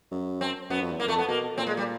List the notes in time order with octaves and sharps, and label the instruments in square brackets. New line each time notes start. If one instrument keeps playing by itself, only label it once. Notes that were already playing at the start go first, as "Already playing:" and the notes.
[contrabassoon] F#2
[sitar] C4
[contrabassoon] F#2 [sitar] B3
[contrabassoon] F2
E2
[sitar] A#3
[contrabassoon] F2
[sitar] A3
B3
[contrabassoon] B2 [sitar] A#3
[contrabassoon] A#2 [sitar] C4
[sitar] G#3
G3